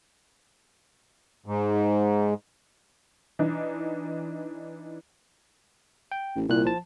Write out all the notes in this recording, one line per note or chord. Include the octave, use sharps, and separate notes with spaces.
G#2
E3 D4 D#4
G5
A1
C2 A#2 E4 F#6
F3 A5